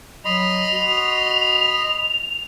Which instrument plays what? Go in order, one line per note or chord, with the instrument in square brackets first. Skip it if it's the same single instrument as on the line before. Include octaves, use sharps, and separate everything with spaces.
[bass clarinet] F#3 [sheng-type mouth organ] D#5 B5 C6 [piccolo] F7
[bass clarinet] F#4